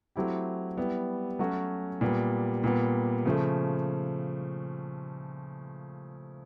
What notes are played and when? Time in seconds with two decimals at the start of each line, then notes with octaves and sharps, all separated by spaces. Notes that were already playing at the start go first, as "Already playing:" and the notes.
0.16 F#3 A3 C4 E4 G4
0.77 G3 B3 E4
1.39 F#3 A3 C#4 F#4
2.01 A#2 G3 B3
2.64 A#2 G3 B3
3.25 C#3 F3 A3